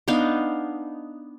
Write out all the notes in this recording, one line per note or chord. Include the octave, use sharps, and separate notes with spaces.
B3 D4 D#4 F5